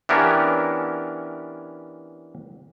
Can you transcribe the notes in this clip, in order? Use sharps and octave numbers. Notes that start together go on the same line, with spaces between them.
E3 B3 C#4 D4 G4 A#4